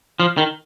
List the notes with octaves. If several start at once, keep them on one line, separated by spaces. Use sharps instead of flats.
F3
D#3